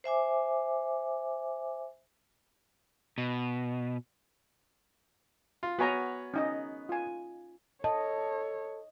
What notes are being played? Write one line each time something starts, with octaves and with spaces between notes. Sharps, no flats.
C5 E5 G#5 D6
B2
F4
B3 F#4 C#5 G#5 A#5
C#4 D#4 D#5
F4 G#5
A4 C#5 D#5 A5